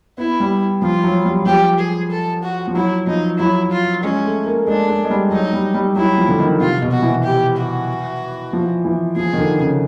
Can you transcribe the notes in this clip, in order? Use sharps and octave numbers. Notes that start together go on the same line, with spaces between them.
B3 E4
G3
F3 F4
F#3
G3
F#3
F3 G4
G#4
A4
F#4
F3
F#3 E4
F3 D#4
F#3 E4
F4
G#3 C#4
A3
A#3
A3
G#3 D4
G#3
G#3
G3
F#3 D#4
G3
G3
F#3 E4
F3
D3
D#3
C3 F4
B2
F#4
E3
G4
F#4
F3
E3
F3 G#4
D#3
D3
C#3